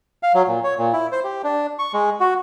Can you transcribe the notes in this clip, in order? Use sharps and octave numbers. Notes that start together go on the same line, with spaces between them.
F5
F#3
A#2
C#5
A#2
E4
C5
G4
D4
C#6
G#3
F#4